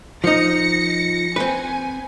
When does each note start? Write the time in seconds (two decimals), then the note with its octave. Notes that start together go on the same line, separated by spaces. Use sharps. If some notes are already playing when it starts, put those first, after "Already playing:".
0.24 F3 D#4 A#6 C#7
1.36 C4 B4 G#5